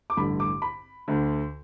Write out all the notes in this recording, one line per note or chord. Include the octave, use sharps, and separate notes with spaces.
D6
A1 G2 D3 B5
D6
B5
D2 D3